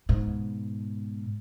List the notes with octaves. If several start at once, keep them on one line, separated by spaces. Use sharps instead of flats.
G#2 B2